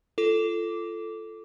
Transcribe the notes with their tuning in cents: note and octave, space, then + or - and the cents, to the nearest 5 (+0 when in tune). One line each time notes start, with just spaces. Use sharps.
F4 -25 A4 +0 D6 -10